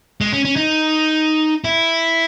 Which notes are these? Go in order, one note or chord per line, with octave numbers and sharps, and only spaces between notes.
G#3
C#4
C#4
D#4
E4